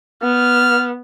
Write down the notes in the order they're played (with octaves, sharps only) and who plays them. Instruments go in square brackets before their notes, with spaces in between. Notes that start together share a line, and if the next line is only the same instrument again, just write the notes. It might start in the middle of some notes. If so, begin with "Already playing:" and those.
[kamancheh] B3 [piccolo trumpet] F6